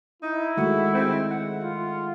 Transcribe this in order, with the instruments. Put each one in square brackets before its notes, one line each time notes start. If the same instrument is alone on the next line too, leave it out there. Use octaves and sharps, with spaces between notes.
[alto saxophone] D#4 [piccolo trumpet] E4
[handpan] D#3 G#3 A3 [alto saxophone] F#4
[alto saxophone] C4
F#5
[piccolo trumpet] F4